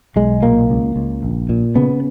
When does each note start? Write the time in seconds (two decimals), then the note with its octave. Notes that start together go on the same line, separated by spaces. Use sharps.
0.16 B1 G#3
0.43 A#2 A#3
0.70 C#2
0.96 C#2
1.23 A#1
1.49 A#2
1.76 C#3 B3